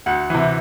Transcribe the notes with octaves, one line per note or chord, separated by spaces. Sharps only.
D2 F#5
C3 E3